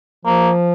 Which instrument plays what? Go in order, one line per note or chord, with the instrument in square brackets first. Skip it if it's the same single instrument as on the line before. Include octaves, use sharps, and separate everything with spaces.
[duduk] F3 [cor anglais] A#3